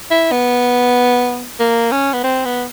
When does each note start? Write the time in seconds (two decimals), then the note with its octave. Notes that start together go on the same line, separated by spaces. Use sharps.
0.11 E4
0.32 B3
1.60 A#3
1.92 C#4
2.13 B3
2.24 C4
2.45 B3